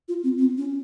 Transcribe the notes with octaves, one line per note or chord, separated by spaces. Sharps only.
F4
C4
C4
C#4